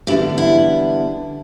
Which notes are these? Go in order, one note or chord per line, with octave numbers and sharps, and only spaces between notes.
E2 D3 G3 B3 D4 E4 G4
E4